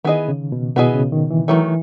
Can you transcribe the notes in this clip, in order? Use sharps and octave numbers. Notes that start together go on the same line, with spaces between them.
D#3 B3 E4 G#4 D#5
C#3
B2
B2 B3 E4 G#4 D#5
C#3
D#3
E3
D#3 E3 F#3 A3